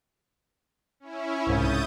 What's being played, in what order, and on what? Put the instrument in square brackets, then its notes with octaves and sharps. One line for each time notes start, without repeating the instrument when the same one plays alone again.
[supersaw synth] C#4 E4
[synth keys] C2 G#2 C#3 [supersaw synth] D#6 G6 A6